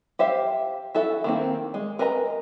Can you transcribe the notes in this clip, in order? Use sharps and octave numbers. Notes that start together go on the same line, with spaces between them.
G4 C5 E5 F5
E4 F#4 A4 E5
D#3 A#3 C4
G#3
A#4 B4 D#5 A5 A#5